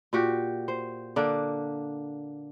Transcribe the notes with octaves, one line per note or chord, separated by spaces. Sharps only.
A#2 F#4 G4
C5
D3 A#3 D4